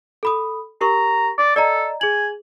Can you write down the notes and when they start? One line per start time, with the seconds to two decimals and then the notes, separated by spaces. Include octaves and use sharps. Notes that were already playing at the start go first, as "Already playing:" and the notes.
0.23 A4 B5 D#6
0.81 G4 A#4 A#5 C#6
1.38 D5
1.56 A4 D5 D#5 A#5
2.01 G#4 G#5 F#7